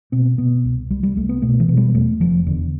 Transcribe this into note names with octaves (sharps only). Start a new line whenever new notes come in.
B2 C4
B2 B3
C2
C2 G3
G3
C2 A3
B3
B2 A3
E3
B2
G3
E2 A3
F1 F3
E2 D3